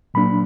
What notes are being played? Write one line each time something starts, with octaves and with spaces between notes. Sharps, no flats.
A#2 F#3 A#3 D4 B5